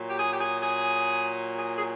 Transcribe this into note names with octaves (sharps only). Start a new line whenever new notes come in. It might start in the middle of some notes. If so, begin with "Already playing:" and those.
Already playing: A#2 F#3
G4
G#4
G4
G#4
G#4
G#4
G#4